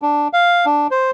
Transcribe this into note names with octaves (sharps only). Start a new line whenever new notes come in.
D4
F5
D4
C5